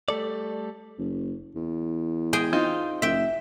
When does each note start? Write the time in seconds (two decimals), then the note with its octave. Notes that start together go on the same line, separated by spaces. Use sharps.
0.08 G3 A3 A4 D5
0.99 F#1
1.55 E2
2.33 G#3 G#4 G5
2.53 C4 D#4 F4
3.02 F#1 E5 G5